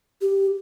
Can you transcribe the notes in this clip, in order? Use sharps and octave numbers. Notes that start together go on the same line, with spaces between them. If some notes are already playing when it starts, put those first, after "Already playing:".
G4